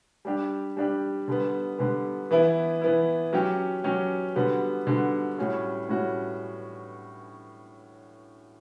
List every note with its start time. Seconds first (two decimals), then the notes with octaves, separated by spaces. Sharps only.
0.25 G3 D4 G4
0.77 G3 D4 G4
1.28 D3 G3 B3
1.79 D3 G3 B3
2.31 E3 B3 E4
2.81 E3 B3 E4
3.33 F#3 C#4 G4
3.84 F#3 C#4 G4
4.35 D3 G3 B3 F#4
4.87 D3 G3 B3 F#4
5.38 A2 G3 C#4 F#4
5.89 A2 G3 C#4 F#4